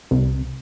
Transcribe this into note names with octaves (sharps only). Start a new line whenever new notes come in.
C2